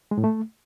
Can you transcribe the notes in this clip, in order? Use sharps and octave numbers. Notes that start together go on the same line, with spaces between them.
G#3
A2
A3